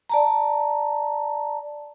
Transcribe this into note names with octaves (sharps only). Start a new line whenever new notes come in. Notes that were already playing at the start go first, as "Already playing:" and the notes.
D5 A5 A#5